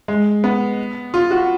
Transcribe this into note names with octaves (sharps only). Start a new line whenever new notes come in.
G#3
B3
F4
F#4